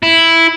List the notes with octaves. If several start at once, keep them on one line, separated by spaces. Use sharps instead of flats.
E4